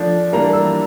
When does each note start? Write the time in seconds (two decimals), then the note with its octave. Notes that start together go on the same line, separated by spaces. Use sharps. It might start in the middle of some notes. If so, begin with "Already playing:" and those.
Already playing: F3 A3 D4
0.33 E3 G3 A#3 D4 A#5
0.53 E6